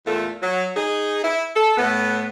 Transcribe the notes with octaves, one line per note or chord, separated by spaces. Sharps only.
E2 A#2 A3 F4 A4
F#3
D#4 G#4
E4
A4
A2 B3